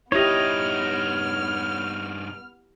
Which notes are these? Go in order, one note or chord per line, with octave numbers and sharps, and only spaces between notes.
G2 B3 D#4 E4 G4 C#5 D#5 F6